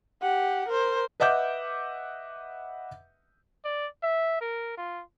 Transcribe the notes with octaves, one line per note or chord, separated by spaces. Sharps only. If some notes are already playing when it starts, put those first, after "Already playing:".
G4 F#5
A#4 C5
B4 D#5 E5 F#5 D6 G6
D5
E5
A#4
F4